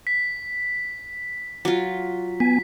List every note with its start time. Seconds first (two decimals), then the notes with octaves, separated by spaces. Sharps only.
0.07 B6
1.65 F#3 F4
2.40 B3 G#5 B6